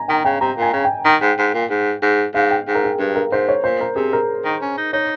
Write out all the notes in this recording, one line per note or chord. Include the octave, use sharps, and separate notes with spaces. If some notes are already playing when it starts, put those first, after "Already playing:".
Already playing: G#5 A#5
D#3 G5
C#3 G5
C3 A#5
A#2 G#5
C#3
G5
D#3
G#2
G#2
A#2
G#2
G#2
G#2 F5
G5
G#2
A#4
G#4
G2 G#4
A#4
G#2 C5
C#5
A#2 C5
A#4
C3 G#4
A#4
D#3
C#4
D#4
D#4 C#5